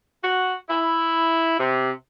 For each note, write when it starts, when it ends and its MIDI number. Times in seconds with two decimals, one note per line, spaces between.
0.23 0.53 66
0.69 1.55 64
1.59 1.90 48